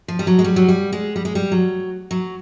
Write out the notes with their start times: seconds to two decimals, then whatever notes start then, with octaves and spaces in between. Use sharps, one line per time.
0.08 F3
0.19 G3
0.27 F#3
0.39 G#3
0.44 G3
0.56 F#3
0.68 G3
0.93 G#3
1.16 G3
1.25 G#3
1.35 G3
1.52 F#3
2.11 F#3